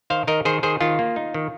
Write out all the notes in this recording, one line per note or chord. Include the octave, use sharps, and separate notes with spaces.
D#3 C5 F5
D#3 A#4 D#5
D#3 G#4 C5
D#3 G#4 C5
D#3 F4
A#3
D#4
D#3